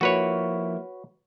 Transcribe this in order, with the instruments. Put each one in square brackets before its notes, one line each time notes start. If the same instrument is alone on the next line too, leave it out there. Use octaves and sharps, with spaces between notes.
[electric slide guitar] F3 A#3 E4 [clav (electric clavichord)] F#4 B4 C#5